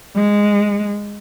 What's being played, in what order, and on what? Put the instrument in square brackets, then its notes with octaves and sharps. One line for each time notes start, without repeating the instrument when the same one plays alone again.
[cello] G#3